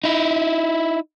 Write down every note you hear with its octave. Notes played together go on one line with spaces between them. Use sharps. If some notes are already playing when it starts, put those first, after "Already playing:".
D#4 E4